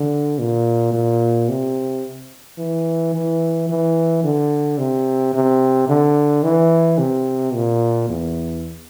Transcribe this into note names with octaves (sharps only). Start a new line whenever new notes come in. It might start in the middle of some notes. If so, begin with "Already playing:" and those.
Already playing: D3
A#2
A#2
C3
E3
E3
E3
D3
C3
C3
D3
E3
C3
A#2
E2